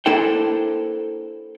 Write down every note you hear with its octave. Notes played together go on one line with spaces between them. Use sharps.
A#3 D4 E4 A4 C5 G5